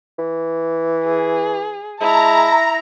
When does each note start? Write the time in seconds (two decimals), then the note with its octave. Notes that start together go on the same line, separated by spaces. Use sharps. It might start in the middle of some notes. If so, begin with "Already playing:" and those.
0.19 E3
1.05 G#4
2.01 G#3 E4 A5 A#5